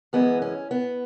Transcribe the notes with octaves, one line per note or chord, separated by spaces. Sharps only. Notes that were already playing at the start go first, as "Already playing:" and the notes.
F#2 E3 G#3 B3
C#4
B3